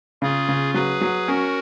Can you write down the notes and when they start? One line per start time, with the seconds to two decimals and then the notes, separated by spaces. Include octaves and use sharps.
0.22 C#3 F4 G#4
0.49 C#3
0.74 F#3 G#4 B4
1.01 F#3
1.27 C#4 F#4 A#4